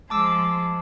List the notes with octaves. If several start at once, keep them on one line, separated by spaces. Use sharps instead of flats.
F3 G#3 A5 D6 E6